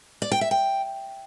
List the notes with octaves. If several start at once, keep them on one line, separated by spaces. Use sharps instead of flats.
D5
G5
E5
G5